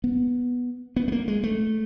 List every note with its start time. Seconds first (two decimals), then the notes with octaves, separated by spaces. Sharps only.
0.04 B3
0.96 B3
1.08 A3
1.12 A#3
1.28 G#3
1.43 A3